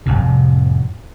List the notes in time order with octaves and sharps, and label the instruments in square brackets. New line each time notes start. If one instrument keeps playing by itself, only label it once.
[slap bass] F1 A#1 A2 C3